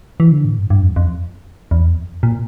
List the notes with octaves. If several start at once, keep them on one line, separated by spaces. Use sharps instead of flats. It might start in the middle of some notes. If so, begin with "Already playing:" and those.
E3
D3
A2
G2
G2
F2
F2
E2
F2
A#2